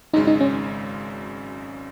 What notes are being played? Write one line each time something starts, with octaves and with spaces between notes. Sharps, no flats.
G#1 F#2 C#3 G#3 D#4
D#4
C#4